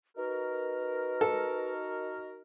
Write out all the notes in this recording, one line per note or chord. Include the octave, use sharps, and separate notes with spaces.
D#4 F#4 A#4 B4
A4